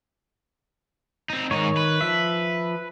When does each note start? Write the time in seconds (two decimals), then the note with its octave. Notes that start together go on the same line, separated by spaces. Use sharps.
1.30 C4 D#4
1.51 G#2 D#3 D#4 C#5
1.77 B4
2.01 F3 E5